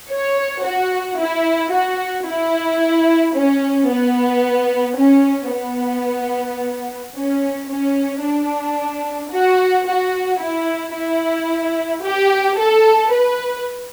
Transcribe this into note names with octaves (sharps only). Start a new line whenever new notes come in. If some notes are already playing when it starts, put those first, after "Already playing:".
C#5
F#4
E4
F#4
E4
C#4
B3
C#4
B3
C#4
C#4
D4
F#4
F#4
E4
E4
G4
A4
B4